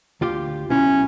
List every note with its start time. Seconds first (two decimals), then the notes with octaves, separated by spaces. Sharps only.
0.21 D2 F4 G4
0.70 B1 C#4 E4